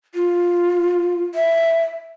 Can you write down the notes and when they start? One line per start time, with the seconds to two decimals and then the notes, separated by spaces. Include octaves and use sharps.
0.15 F4
1.35 E5